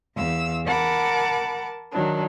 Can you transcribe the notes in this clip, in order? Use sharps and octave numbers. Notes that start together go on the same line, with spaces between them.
E2 F5 E6
A#4 F#5 A5 B5 D6
D#3 F#3 D4